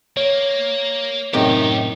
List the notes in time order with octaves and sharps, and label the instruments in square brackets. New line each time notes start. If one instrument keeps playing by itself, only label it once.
[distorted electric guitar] A#3 [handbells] C#5
[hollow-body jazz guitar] F#2 A2 C3 [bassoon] D#3 [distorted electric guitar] D#4 G4